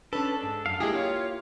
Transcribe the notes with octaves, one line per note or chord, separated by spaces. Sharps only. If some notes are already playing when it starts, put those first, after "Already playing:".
C#4 D4 A4 B4
G#2
F#2 F5
G#3 A#3 E4 G4 G#4
F4 C#5 F5